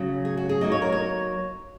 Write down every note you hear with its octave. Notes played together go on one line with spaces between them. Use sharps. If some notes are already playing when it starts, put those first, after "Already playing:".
Already playing: C#3 F#3 C#4
G#4
F#4
G#4
F#3 A#3 D#4 D#5
C#5
A#4
C#5